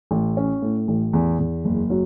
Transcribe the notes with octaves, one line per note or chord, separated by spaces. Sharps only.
A1
C#4
A2
A1
E2
E2
F#1
F#3